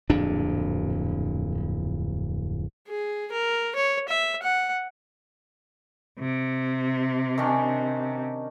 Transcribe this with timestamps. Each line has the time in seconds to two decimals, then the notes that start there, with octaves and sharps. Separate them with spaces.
0.10 D1 F2 A#2 D4
2.88 G#4
3.32 A#4
3.76 C#5
4.09 E5
4.43 F#5
6.19 C3
7.38 D#3 C#4 D4